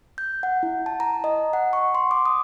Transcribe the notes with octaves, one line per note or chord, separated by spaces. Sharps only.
G6
F#5
E4
A5
A#5
D#5
F#5
C#6
C6
D6
D#6